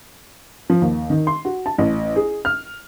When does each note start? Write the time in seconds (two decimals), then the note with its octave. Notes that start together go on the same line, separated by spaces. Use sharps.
0.70 F3
0.82 D#2
1.10 D#3
1.27 C6
1.45 F#4
1.66 A5
1.78 A1
2.16 G#4
2.45 F6